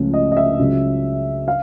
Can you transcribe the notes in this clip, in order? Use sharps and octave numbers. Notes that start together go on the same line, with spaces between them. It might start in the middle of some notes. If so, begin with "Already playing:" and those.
Already playing: C#2 C#3 F3 A3
D#5
D#5
E5
C#2 C#3 F#3
F5